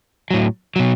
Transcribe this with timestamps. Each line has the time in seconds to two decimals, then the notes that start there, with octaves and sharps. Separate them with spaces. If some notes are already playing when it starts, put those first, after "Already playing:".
0.31 A2 F#3
0.76 B2 F#3